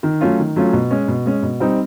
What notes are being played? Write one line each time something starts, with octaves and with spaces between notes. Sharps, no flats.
D#3
F#3 A3 C#4 F4
D#3
F#3 A3 C#4 F4
B2
G#3 C#4
B2
G#3 C#4
B2
G3 C4 D#4